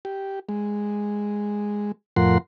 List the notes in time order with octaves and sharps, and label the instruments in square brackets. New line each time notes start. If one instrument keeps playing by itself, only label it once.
[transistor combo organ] G4
G#3
F2 A2 F3 A#4 F#5 C6